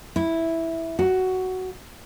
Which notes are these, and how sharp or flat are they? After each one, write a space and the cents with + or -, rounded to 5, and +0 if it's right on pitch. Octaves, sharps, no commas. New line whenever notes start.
E4 -5
F#4 +10